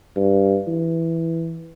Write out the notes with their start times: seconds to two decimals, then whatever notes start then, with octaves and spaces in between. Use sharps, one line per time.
0.16 G2
0.67 E3